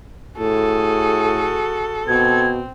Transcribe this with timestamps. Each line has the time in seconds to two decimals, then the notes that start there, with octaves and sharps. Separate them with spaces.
0.38 A2 F#4 G#4 A4
2.07 B2 C4 G#6